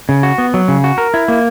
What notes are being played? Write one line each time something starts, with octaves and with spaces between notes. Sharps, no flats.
C#3
F#4
B3
F#3
C#3
F#4
A#4
E4
A#3